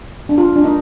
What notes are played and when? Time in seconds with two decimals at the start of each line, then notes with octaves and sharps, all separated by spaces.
0.29 D4
0.38 F4
0.56 D4
0.64 D#4